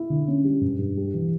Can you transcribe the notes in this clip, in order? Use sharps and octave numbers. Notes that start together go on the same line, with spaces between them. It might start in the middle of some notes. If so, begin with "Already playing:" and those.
Already playing: E4
D3
C#4
G3
G2
G2
G3
E3